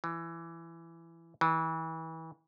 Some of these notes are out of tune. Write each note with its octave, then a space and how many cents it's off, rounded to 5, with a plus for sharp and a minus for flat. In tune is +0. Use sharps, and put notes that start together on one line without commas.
E3 +15
E3 -30